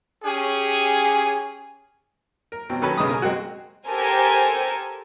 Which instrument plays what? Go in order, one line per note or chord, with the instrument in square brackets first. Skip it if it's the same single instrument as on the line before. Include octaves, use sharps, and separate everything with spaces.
[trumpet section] C#4 G4 G#4 G#5
[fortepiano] A#4
B2 F#3 C4
D#3 F#3 C#4 A4 B4
B1 C#3 G#3 B4 D#6
A#4 G#5
G#3 A#3 C4 F#4
[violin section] G4 A4 A#4 C5 G#5